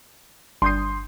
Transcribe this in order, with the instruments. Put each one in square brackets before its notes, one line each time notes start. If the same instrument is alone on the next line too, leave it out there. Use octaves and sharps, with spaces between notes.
[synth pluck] G1 D#6 [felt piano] C6 G6 C7